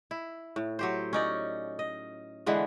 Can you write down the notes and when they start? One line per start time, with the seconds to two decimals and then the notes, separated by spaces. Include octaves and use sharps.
0.11 E4
0.56 A2
0.79 F#3 G4 C5
1.13 C#4 D#4 D5
1.79 D#5
2.46 D3 E3 G#3 B3